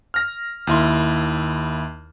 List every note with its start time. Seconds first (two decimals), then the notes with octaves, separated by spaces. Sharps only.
0.14 F6 A#6
0.67 D#2 E4 C6